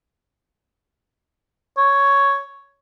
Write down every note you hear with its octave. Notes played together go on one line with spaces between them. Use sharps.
C#5